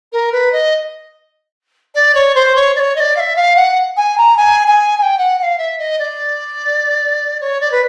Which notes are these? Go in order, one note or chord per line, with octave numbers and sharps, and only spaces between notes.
A#4
B4
D#5
D5
C#5
C5
C#5
D5
C#5
D#5
D5
F5
E5
F5
F#5
G#5
A#5
G#5
G#5
G#5
G5
F#5
F#5
F5
E5
D#5
D5
C#5
D5
B4